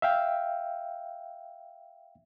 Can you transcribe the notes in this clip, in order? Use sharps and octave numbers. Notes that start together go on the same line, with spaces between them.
E5 F5 G5